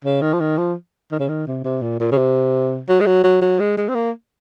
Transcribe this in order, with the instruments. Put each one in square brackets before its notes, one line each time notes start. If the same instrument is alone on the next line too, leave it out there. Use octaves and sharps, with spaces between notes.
[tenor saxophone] C#3
D#3
F3
D#3
F3
D#3
C#3
D#3
C3
C3
A#2
A#2
C#3
C3
F#3
G#3
F#3
F#3
F#3
G#3
G#3
C4
A#3